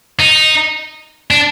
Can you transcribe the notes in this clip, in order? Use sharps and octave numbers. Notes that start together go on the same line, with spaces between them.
D#4
D4